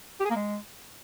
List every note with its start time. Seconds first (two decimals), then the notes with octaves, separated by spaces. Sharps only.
0.20 G4
0.25 G#4
0.30 A#3
0.36 G#3